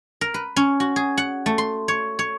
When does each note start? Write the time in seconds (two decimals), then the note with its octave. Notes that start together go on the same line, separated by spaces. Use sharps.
0.21 A#4
0.34 B4
0.56 C#4
0.80 F#4
0.96 G#4
1.17 F#5
1.46 A3
1.58 C6
1.88 C#5
2.19 C#5